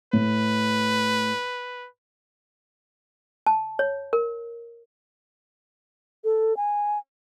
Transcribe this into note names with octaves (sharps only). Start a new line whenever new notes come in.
A2 B4
A5
C#5
A#4
A4
G#5